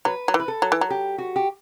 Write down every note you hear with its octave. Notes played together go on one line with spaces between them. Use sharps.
F#3 B4
F#3
E3
B4
A4
F#3
E3
F#3
G4
F#4
G4